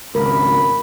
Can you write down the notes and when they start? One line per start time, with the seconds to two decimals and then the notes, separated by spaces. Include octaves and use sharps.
0.15 G#1 C#2 A#4 B5